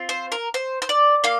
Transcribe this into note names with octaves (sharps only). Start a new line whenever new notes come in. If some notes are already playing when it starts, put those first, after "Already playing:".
Already playing: C4 F4
C5
A#4
C5
C5
D5
A#3 F5